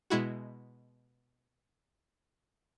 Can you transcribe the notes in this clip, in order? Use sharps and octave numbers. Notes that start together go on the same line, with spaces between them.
B2 G#3 E4 F#4